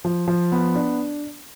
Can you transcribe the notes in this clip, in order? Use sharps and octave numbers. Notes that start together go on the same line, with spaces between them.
F3
F3
B3
D4